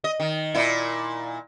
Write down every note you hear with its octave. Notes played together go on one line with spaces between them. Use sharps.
D#5
D#3
A#2 E4